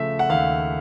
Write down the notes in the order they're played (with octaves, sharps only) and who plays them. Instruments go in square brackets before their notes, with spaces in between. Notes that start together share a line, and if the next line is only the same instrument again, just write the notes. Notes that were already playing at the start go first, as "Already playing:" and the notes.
Already playing: [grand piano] C#3 F3 A3 E5
F#5
D#2 F5